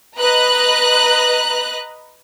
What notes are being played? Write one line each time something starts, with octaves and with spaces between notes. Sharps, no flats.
B4 D#5 A#5 F#6